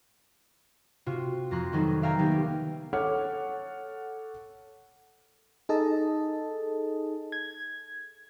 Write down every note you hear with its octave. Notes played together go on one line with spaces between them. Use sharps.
C3 F4 F#4
F2 A#5 C6 F#6
D#3 F#3 G3 B3 D#4 A4
D5 E5 F5 G5 G#5 A#5
D#3 G3 A#3 B3 D#4 G4
A4 C#5 F#5 D6 F6
D#4 G#4 A4 D#5 A5
G#6